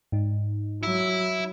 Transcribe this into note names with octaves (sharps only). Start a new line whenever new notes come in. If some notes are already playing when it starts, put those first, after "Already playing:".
G#2 D#4
F#3 E4